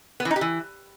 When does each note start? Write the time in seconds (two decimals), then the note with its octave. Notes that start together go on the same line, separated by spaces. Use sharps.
0.20 B3
0.25 E3
0.31 D#4
0.36 G4
0.41 E3